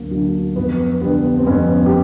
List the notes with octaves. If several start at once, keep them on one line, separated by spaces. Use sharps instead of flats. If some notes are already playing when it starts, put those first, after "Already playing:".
Already playing: D2 D3 F#3 A#3
D3 F#3
F2 B3
D3 G3 B3
C4
F2 B3 C#4
G4